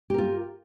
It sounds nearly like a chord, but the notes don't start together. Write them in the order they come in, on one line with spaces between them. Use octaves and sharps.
G4 A#4 F4